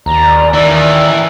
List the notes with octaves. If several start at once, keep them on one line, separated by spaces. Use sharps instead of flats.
D#2 D5 A#5
D#3 E3 C#4 E6